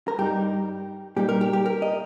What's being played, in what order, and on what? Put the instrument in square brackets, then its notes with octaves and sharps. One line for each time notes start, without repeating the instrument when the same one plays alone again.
[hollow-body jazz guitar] A#4
G2 G3 D#4 G4
A#2 G3 A#3 D#4 G4
A#4
G4
G4
A#4
D#5